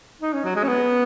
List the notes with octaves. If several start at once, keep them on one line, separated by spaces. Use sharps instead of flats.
D#4
C#4
F#3
G#3
C#4
B3